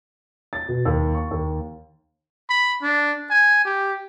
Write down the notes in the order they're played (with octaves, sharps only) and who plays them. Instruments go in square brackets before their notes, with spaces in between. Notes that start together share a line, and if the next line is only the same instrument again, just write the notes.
[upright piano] A6
B2
D#2
C#6
D#2
[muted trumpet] B5
D4
G#5
G4